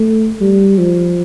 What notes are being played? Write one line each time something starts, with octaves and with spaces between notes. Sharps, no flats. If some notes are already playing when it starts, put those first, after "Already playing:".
Already playing: A3
G3
F3